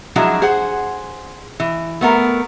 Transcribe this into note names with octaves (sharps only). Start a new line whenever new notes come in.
F3 F#3 G#3 D4 E4 F#4
G#4 C5 F#5
E3
A3 B3 A#4